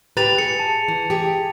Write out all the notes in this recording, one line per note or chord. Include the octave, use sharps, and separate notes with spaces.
A2 G4 B4 A#5 A6 F7
G#4 C#7
A5
E3
G4 G#4